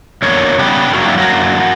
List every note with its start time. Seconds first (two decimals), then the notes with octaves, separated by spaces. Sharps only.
0.22 E2 D3 A#3 A#4 C#5
0.58 C#3 G3 B3 G4 B4
0.93 G2 F#3 A#3 F#4 A#4
1.05 E4 G4
1.18 F#4 A#4
1.29 F#2 D3 A#3